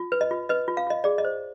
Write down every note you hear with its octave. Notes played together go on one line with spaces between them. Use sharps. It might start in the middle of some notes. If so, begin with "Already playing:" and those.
Already playing: F4
B4
D#5
F4
B4 D#5
F4
F5
F4 D#5
G#4 D5
D#5
C5